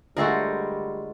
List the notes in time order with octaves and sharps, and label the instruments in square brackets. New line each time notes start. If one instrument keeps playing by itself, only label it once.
[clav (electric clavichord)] D2 [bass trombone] G3 [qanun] G#3 F4 C5 [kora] F#4 A4 A#4